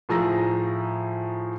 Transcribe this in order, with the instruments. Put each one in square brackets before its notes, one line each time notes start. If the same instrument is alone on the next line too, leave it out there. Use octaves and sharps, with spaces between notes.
[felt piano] A2 F3 G#4 A#5 E6 A#6